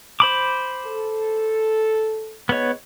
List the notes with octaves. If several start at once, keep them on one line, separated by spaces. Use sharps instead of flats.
C5 B5 D6
A4
G#2 B3 G#4 C#5 D#5